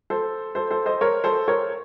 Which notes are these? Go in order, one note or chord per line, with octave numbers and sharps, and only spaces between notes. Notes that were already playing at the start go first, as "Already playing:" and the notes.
A4 C5
A4 C5
A4 C5
C5 D#5
A#4 C#5
A4 C5
A#4 C#5